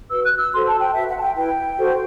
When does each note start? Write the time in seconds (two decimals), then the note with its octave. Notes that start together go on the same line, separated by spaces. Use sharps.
0.11 F#4 B4 E6
0.25 F#6
0.38 E6
0.53 F#4 A4 C5 C6
0.67 A5
0.80 G5
0.94 F#4 B4 E5
1.08 F#5
1.17 A5
1.21 G5
1.35 E4 B4 G5
1.77 F#4 A4 C5